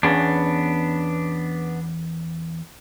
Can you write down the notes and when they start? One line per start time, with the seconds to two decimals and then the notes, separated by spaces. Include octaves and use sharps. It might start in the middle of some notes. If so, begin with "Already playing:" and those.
0.03 E2 B3 C#4 D4 G#4